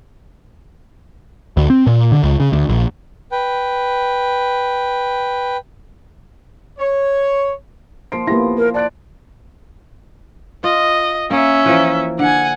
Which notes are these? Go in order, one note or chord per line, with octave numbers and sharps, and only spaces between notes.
D2
C4
A#2
D3
C#2
C#3
D2
A#1
B4 G5
C#5
F3 A#3 C7 D7
A#3 B3 E4 G4 A#6
A#4
D5 A5 F#6 D7
F4 D#5
A#3 C#4 E5
E3 F3 A#3
D3 F#5 G#5